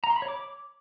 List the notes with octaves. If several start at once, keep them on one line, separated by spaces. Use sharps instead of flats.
A#5
C6
B5
C#5
D6